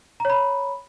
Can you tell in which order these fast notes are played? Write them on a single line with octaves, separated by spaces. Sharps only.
A#5 C#5 B5